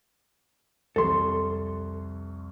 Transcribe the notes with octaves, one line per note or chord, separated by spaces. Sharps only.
C2 F2 A4 C6